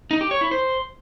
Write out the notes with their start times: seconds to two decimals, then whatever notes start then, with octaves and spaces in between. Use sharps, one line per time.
0.11 D#4
0.21 G4
0.31 C#5
0.41 E4
0.51 C5